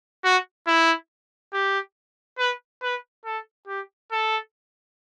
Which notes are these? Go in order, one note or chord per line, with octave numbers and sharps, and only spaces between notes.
F#4
E4
G4
B4
B4
A4
G4
A4